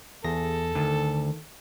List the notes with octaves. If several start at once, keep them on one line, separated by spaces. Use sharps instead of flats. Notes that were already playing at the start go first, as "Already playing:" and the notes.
E2 G#4 A4 A#6
D2 D#3